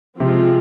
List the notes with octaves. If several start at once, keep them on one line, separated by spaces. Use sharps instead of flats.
C3 F3 G#3 C4 F4